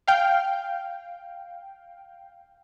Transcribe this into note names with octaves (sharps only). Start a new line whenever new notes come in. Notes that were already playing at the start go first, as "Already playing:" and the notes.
F5 G5